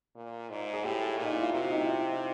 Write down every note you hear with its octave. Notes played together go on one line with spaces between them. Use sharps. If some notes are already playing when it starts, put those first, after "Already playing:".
A#2
G#2
G#4
A2 G4
A#2
D#4
E4
F4
C3 F#4
D#4
E4
F4